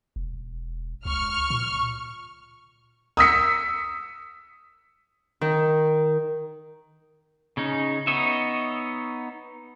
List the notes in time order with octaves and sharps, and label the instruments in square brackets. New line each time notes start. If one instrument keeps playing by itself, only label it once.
[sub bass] E1
[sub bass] C#2 [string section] C#6 F6
[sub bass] A#2
[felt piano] D#6 E6 B6 C#7
[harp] D#3
[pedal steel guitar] C#3 C#4 D#4
B3 D#4 C#5 D#5 E5